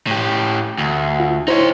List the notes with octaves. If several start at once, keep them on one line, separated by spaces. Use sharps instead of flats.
A2 G4
D2
F4
D#4 E4 C5 C#5